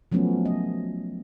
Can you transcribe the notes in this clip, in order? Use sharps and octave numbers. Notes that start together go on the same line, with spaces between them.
F3 F#3 A3 B3 C#4
D#5